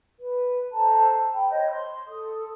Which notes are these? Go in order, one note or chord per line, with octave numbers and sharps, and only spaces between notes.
B4
A4 C5 A5 A#5
G5 B5
C5 C#5 D#5 G6
C6
A4 D#6